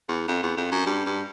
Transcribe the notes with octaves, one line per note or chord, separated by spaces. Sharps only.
E2
F2
E2
F2
F#2
G2
G2